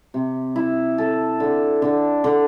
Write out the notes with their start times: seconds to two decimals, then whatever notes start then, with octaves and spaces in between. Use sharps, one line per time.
0.14 C3
0.56 E4
0.98 A4
1.40 D3
1.82 D3
2.24 D3